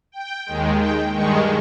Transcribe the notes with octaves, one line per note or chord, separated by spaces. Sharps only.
G5
D#2 D#3 G#3
G5
G2 D#3 G#3 C#6